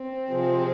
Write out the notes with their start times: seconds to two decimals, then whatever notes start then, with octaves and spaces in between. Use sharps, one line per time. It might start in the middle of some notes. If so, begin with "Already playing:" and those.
Already playing: C4
0.28 C3 F3 G#3